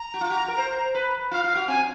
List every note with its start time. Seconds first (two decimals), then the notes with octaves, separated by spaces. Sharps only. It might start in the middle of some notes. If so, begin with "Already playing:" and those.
Already playing: A#5
0.14 F#4
0.21 F4
0.30 F#4
0.48 A#4
0.58 C5
0.95 B4
1.31 F4 F5
1.44 F4
1.55 F#4
1.68 C4 G#5